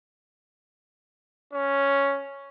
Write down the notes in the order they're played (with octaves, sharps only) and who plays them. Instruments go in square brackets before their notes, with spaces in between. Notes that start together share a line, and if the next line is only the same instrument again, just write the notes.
[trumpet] C#4